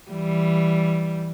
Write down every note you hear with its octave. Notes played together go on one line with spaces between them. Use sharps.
E3 G3